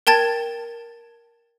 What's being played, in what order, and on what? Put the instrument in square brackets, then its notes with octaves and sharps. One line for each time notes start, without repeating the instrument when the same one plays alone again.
[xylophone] A#4 G5 A5 G#6 A6